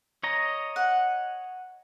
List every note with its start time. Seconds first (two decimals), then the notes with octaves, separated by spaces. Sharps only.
0.23 C#5 D#5 A#5
0.76 F#5